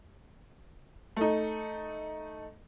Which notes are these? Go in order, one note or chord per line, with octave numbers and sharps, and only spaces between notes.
A3 D#4